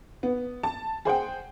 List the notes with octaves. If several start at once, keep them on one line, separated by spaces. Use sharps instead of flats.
B3
A5
G#4 C5 F#5 G5